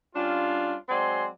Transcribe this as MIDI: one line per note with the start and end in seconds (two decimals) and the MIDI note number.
0.15 0.75 55
0.15 0.75 61
0.15 0.75 62
0.15 0.75 65
0.88 1.27 54
0.88 1.27 56
0.88 1.27 60
0.88 1.27 74
0.88 1.27 80
0.88 1.27 84